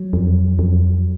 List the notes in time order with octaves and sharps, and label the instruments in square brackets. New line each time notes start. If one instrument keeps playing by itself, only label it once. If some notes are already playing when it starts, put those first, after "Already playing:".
Already playing: [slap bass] F#3
[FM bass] F2
F2